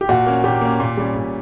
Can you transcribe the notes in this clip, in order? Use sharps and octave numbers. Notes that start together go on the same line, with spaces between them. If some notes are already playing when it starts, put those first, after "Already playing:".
G4
A#2 F#4
A#3 C#4
A#2 G4
A#3 C#4
A#2
G3 C#4
A#2